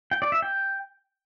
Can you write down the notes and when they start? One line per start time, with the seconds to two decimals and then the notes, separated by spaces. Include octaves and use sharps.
0.11 G5
0.22 D5
0.32 E5
0.42 G5